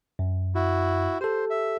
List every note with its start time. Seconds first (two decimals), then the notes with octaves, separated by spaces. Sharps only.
0.19 F#2
0.55 E4 F#4
1.21 G4 A4 C5
1.50 E5